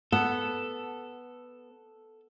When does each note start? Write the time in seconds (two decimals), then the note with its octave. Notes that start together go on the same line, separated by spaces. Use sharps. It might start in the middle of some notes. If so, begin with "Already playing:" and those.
0.12 B3 A4